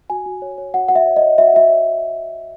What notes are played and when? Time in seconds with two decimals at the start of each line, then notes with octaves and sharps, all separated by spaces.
0.10 F#4 G#5
0.26 F#4
0.42 C#5
0.58 C#5
0.74 F#4 F#5
0.88 F#4 F#5
0.95 E5
1.06 C#5
1.16 D#5
1.22 C#5
1.38 F#4 E5
1.47 F#5
1.54 F#4 E5
1.70 C#5